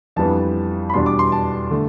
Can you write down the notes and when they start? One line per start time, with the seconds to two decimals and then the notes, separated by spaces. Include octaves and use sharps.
0.16 F2 E3 G3 B3 D4 A5
0.90 B5
0.94 E2 B2 G3 D4 C6
1.06 D6
1.19 C6
1.32 A5
1.71 D3 A3